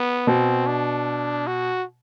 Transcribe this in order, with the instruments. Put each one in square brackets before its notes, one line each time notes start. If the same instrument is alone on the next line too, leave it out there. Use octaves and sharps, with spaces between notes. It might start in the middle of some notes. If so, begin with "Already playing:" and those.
Already playing: [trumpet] B3
[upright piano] B2 [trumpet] C4
[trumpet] D4
F#4